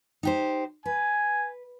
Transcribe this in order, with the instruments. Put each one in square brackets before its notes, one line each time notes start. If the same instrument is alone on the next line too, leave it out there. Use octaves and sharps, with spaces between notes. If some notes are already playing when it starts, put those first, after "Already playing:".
[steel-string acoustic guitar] D#4 G4 C5
[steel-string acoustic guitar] B4 [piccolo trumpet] G#5